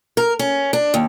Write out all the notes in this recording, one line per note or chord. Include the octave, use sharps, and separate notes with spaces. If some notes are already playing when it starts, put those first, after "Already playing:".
A#4
C#4
D4
D#2